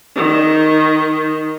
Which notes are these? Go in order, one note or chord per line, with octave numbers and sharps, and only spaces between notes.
D#3